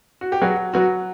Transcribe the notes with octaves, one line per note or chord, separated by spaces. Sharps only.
F#4
G4
F#3 F#4 G#4
F#3 F#4